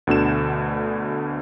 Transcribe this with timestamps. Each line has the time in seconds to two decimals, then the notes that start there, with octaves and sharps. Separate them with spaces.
0.07 D2 B2 D3 E7